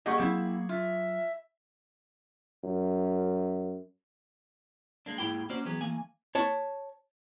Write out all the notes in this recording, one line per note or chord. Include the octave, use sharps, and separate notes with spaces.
G3 A#3 G4 G#4 D#5 F#5 C#6
F#3 C4 E4
F4 E5
F#2
G#3 A#3 D4
G#2 A#3 E4 G4 G#4 G5
A#3 C#4 F#4 C5 D5
E3 F#3 B3 G4 G#4
E3 A3 A#3 G#5
C#5 A5